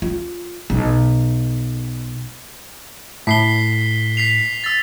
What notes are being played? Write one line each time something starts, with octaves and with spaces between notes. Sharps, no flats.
F4
B1
A2 B6 C7 G7
B6 C7 F7
E6 A6